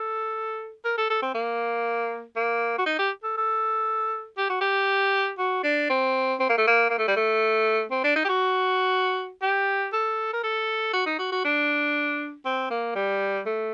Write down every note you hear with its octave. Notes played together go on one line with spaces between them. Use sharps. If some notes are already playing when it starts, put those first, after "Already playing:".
Already playing: A4
A#4
A4
A4
C4
A#3
A#3
F#4
D#4
G4
A4
A4
G4
F#4
G4
F#4
D4
C4
C4
A#3
A3
A#3
A#3
A3
G3
A3
C4
D4
D#4
G4
F#4
G4
A4
A#4
A4
F#4
D#4
F#4
F#4
D4
C4
A#3
G3
A3